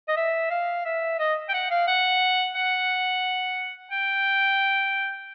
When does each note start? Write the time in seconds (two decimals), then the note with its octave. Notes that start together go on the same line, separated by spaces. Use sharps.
0.09 D#5
0.17 E5
0.51 F5
0.86 E5
1.19 D#5
1.49 G5
1.54 F#5
1.71 F5
1.88 F#5
2.55 F#5
3.91 G5